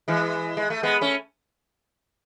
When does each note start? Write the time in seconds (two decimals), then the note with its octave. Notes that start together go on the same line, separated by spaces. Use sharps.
0.08 E3 G#3
0.57 G#3
0.70 A3
0.83 G#3 B3
1.01 A3 C#4